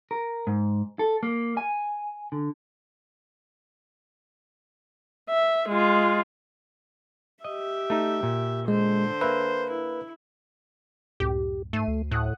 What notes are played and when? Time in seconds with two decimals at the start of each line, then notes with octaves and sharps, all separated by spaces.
0.11 A#4
0.47 G#2
0.99 A4
1.23 A#3
1.57 G#5
2.32 D3
5.30 E5
5.69 G#3 F4
7.44 G4 D#5 E5
7.90 A3 D#4
8.23 A#2
8.68 D3 G#3 C5
9.21 A#3 B4 E5
9.71 E4
11.20 C#2 F#2 A2 G4
11.73 G#2 A3 C7 D#7
11.87 D2
12.11 A2 F#5 D#6 F#6